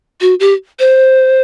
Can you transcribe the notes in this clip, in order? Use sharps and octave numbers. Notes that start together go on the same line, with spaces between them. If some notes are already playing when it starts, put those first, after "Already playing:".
F#4
G4
C5